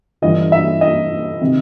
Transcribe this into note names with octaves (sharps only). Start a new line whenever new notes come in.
G1 G2 E3 D#5
E5
D#5
C3 D#3